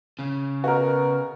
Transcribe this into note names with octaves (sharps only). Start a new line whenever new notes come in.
C#3
B2 F#4 A#4